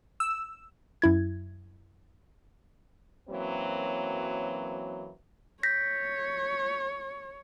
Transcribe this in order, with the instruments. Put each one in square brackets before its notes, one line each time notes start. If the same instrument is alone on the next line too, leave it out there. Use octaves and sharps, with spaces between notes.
[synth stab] E6
[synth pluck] F#2 E4 G#6
[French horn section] F#2 E3 F#3 A#3 C4
[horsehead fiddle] C#5 [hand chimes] G6 A#6 B6